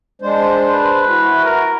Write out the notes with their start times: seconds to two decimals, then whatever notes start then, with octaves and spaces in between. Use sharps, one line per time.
0.22 G#3 D4 C5
0.74 B4
1.08 E4 F#4
1.45 A#4